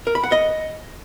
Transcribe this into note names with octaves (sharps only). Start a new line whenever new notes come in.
A#4
B5
F#5
D#5